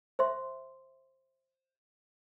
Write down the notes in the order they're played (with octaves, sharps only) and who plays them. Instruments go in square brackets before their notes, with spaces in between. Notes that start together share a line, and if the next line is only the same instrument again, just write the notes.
[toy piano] C5 E5 C6